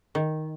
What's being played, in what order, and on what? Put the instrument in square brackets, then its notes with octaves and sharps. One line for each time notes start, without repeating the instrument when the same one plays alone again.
[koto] D#3